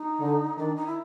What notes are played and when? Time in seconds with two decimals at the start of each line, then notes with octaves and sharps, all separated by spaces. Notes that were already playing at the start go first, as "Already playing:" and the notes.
Already playing: D#4
0.20 D3
0.57 D#3 D4
0.76 D#4
0.86 E4